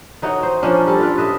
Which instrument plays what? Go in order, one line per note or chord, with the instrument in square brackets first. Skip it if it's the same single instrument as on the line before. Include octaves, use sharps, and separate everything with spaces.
[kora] E3 D#4 F#4 C#5
C5
F3 A#3 C#4 D4
G3 A4
F4 B4 D5
B4 D#5 E5